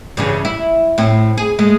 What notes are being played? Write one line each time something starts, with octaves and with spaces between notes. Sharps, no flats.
G2 C#3 E3
E4
A2 C4
G#4
G#3 A3